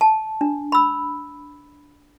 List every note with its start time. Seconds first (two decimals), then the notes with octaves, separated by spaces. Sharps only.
0.01 A5
0.41 D4
0.72 B5 E6